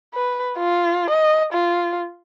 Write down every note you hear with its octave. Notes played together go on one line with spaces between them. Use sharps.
B4
F4
D#5
F4